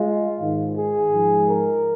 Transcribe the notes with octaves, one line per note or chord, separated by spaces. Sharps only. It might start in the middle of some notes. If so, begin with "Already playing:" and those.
Already playing: G#3 F4
G#2 D#3 G#3
G#4
G#2 F3 G#3
A#4